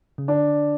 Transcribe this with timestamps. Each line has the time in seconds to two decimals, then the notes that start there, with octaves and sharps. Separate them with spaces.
0.18 C#3
0.28 D3 D4